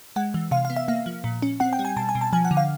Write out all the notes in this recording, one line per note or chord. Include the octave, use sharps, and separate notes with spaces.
G#3 F#5
E3
C3 F5
F5
B3
E5
A#3 F5
F3
A#2
C#4
C4 F#5
G5
G3
G#5
B2 A5
G#5
B2
A5
F3 G#5
F#5
D3
F5